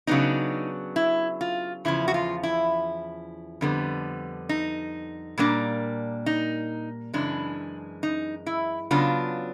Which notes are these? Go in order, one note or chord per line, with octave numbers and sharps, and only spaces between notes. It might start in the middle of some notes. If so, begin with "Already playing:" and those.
C#3 F#3 B3 D4 D#4
E4
F4
E2 C#3 F3 E4
F#4
F4
E4
F2 D3 G3 B3
D#4
A#2 G3 A#3 D4
D#4
F#2 C#3 E3 G#3 D4
D#4
E4
C#3 F#3 B3 D4 F4